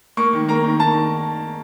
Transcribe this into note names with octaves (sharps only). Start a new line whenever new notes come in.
A#3 C#6
D#3
A#3 A#5
D#3
D#3 A5